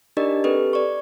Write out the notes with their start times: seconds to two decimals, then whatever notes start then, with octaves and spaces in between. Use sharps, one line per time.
0.17 D4 D#4 G4 A#4 D5 D#5
0.44 C4 G4 A4 B4
0.73 D5 C#6